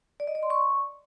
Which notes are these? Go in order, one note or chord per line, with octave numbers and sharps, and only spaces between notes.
D5
D#5
D5
C6
C#6